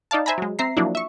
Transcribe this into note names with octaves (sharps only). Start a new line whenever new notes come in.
D#4 D5 F5 A5
C5 E5 G#5 A#5 B5
F#3 G#3
C4 E5 A#5 C7
F3 F#3 A#3 D4 E4
E5 C#6